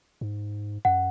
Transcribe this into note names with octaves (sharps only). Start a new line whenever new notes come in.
G#2
F#2 F#5